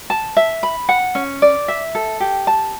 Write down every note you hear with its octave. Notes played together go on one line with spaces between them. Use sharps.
A5
E5
B5
F#5
C#4
D5
E5
A4
G4
A5